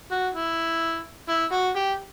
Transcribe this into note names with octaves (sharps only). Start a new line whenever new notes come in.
F#4
E4
E4
F#4
G4